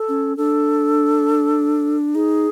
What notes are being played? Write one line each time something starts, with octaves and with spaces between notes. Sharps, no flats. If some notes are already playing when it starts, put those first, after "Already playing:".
Already playing: A4
C#4
D4 A4
D#4 G#4